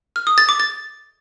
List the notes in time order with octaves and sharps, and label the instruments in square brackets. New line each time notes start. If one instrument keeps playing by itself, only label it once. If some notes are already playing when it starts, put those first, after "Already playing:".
[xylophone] F6
D#6
A6
D6
A6